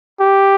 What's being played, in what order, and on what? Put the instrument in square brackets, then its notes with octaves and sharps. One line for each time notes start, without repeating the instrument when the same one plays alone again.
[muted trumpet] G4